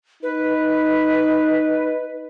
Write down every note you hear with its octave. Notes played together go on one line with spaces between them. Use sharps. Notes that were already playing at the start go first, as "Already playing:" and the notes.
D#4 B4